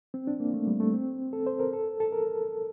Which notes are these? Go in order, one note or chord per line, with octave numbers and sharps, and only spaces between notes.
C4
D4
A#3
A3
G3
A3
C4
A4
C5
A#4
A4
A4
A#4